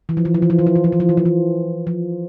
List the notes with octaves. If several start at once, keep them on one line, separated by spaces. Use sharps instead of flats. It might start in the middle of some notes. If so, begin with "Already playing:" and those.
E3
F3
E3
F3
E3
F3
E3
F3
E3
F3
E3
F3
E3
F3
E3
F3